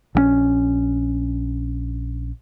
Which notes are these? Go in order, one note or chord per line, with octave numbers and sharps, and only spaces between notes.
A#1 F3 C#4